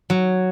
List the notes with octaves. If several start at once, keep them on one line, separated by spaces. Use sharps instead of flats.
F#3